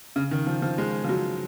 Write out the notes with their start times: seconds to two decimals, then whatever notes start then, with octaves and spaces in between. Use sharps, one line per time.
0.16 C#3
0.31 D#3
0.47 F3
0.62 F3
0.78 G#3
1.04 F3
1.09 F#3